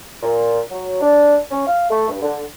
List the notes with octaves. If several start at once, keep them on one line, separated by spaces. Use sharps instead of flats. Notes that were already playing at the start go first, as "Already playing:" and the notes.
A#2
F#3
D4
C#4
F5
A3
G2
D3